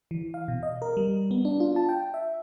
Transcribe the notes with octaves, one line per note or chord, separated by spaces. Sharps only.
E3
F5
B2
D#5
A#4
G3
B3
D4
F4
A5
G5
E5